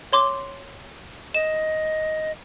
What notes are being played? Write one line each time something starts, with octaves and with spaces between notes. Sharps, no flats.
C#5 C6 D6
D#5 E7